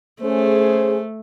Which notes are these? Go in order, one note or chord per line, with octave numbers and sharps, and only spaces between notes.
A3 C#4 G#4 C5